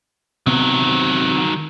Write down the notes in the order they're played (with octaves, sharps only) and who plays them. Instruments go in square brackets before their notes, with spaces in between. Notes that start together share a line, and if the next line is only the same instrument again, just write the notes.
[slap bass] C3 B3 [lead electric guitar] D#3 F#3